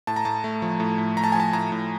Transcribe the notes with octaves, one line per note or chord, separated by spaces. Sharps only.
A2 A5
A#5
A2 A5
A3
F3
A2
A2
A3 A#5
A5
F3 G#5
A5
A2 A#5
A2